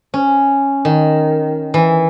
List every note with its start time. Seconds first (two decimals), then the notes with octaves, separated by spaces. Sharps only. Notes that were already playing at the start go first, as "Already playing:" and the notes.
0.14 C#4
0.85 D#3
1.74 E3